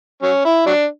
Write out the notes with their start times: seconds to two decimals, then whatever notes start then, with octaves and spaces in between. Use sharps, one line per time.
0.23 F#3 C#4
0.45 E4
0.66 F#3 D4